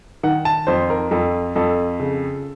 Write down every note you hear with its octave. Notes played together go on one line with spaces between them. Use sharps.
D#3 F#5
A5
F2 C5
A#4
F2 A4
F2 A4
C#3